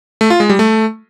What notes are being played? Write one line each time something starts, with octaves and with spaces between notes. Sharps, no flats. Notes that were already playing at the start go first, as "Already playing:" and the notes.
A3
F4
G#3
G3
A3